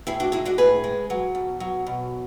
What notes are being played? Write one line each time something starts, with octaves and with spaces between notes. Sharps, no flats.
A2 E4 G#4
D4 F#4
G#3 E4 G#4
D4 F#4
A2 G#4 B4
G#3
F#3
B2
F#3
B2